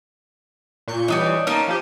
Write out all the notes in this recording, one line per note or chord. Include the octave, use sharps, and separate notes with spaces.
A#2 C#6 G6
E3 G3 D4 D#4 C#5
A#3 C#4 D#4 A5
F3 G4